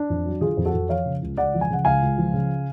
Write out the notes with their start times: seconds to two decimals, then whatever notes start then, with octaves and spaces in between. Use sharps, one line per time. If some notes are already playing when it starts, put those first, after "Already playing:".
Already playing: D4
0.10 F2
0.26 F#3
0.41 D3 F4 G#4
0.57 F2
0.65 F#4 A4
0.74 F2
0.89 F3 C#5 F5
1.06 C#3
1.22 C#2
1.37 C#2 D5 F#5
1.54 F3
1.61 G#5
1.70 C#3 F#5
1.85 C#2 F5 G#5
2.03 C#2
2.18 F3
2.34 C#3